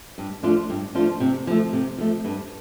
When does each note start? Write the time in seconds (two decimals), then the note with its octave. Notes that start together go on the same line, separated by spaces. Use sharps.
0.18 G2
0.43 F3 A3 D4 F4
0.70 G2
0.95 F3 A3 D4 F4
1.20 C3
1.47 F3 A3
1.73 C3
1.98 F3 A3
2.25 G2